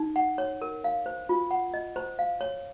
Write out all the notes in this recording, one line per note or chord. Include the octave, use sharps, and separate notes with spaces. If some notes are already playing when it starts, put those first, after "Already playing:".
Already playing: D#4
F#5
C#5
A#4
F5
C5
F4
F#5
D#5
C5
F5
C#5